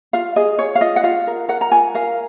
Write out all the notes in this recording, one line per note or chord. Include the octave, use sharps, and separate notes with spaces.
F4 F5
G#4 D#5
G#4 C#5
F5
F4 D#5
F#5
F4 F5
A#4
A#4 F#5
A#5
F4 G#5
A#4 F5